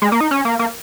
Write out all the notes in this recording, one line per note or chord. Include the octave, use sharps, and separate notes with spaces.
G#3
A#3
D#4
C#4
A#3
A#3